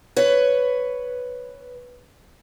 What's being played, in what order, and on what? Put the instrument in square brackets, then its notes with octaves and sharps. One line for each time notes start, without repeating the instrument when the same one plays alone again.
[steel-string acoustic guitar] B4 C#5